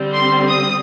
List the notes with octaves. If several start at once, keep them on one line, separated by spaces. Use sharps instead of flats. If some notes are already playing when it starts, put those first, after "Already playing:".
Already playing: D3 G3 C4
C6
D#6